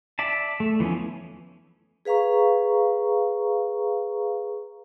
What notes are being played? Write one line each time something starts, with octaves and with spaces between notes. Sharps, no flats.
D5 E5 A5
A3
E3 F3 B3 C#4
G#4 B4 F5 A#5 C#6